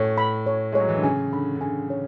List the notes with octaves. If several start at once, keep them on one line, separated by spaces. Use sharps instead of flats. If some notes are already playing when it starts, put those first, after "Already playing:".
Already playing: A2 C#5
B5
C#5
G#3
F#3 C#5
E3
D3
C#3 G#5
D3 B5
D3
C#3 G#5
C#5